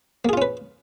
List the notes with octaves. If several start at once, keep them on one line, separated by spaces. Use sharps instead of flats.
A#3 C#4 F4 G#4 B4